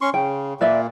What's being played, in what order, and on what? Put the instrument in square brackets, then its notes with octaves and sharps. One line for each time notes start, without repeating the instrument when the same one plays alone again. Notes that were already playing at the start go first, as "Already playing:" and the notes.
[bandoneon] C#4 C6 C#6
[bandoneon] C#3 [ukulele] G5
[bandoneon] A#2 A#3 [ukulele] B4 D5 E5